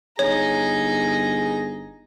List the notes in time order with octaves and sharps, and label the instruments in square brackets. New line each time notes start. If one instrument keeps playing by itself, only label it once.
[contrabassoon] G1 [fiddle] D#4 A#5 [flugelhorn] G#4 [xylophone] C#5